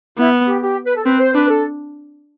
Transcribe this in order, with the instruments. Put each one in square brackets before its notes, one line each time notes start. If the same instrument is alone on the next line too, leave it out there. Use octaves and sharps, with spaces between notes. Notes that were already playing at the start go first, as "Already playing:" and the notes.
[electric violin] B3 [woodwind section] E4
[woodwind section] G4
G4
B4
A4
[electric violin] C4 [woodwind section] B4
[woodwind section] C5
[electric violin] D4 [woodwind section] B4
[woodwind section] A4